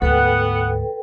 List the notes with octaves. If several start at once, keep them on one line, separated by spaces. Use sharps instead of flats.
D2 G#2 B3 A4 B4 F#5 G5